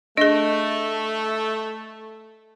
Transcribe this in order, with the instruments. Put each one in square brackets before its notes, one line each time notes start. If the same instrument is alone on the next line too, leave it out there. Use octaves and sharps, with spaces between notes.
[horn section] A3 [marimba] D4 G#4 [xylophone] D#5